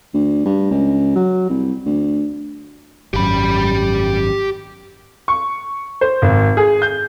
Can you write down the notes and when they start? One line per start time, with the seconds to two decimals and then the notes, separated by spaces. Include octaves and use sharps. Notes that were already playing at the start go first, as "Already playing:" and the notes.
0.14 D2
0.45 G2
0.71 C#2
1.16 F#3
1.50 C2
1.85 D2
3.14 G#1 F#2 G4 B5
5.28 C#6
6.01 C5
6.22 G#1
6.57 G#4
6.82 G6